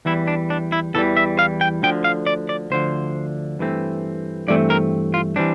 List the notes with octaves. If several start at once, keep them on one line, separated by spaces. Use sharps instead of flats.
E2 E3 G3 E4
D4
D4
E4
E2 E3 G3 A4
E5
F5
G5
D2 D3 F3 G5
F5
D5
D5
D2 D3 F3 C5
G2 E3 A3 C4
G2 E3 A3 C4 D5
A#4
F4
E3 G3 C4 D4